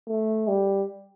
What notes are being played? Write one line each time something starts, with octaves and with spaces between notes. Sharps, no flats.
A3
G3